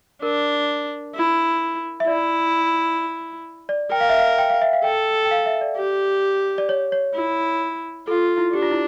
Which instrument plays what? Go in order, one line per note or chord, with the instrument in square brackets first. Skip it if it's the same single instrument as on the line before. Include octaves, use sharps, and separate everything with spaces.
[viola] D4 [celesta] A#4
[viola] E4
[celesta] E5
[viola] E4 [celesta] D5
[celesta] D5
[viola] A#4 [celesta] G5
[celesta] F5
E5
F5
G5
F5
E5
F5
[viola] A4 [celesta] G5
[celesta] G5
F5
E5
D5
[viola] G4
[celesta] D5
C#5
C#5
[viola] E4
[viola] F4 [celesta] A4
[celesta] E4
[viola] D4 [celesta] G4
[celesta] F4
E4